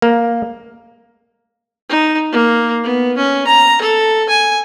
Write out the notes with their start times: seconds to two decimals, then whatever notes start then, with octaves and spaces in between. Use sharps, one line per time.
0.02 A#3
1.89 D#4
2.32 A#3
2.83 B3
3.17 C#4
3.47 A#5
3.81 A4
4.29 G#5